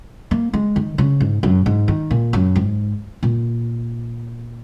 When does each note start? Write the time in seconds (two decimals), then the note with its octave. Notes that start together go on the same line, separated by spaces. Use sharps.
0.31 A#3
0.53 G#3
0.76 D#3
0.98 C#3
1.20 G#2
1.43 F#2
1.66 G#2
1.88 D#3
2.11 A#2
2.33 F#2
2.55 G#2
3.23 A#2